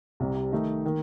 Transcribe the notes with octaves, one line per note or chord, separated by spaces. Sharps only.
C2 C3 G3
D#3 A3 D#4
D#3 A#3